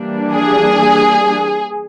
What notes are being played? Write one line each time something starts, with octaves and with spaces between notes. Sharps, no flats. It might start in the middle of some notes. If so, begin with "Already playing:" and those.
Already playing: E3 G3 A#3 D4
G#4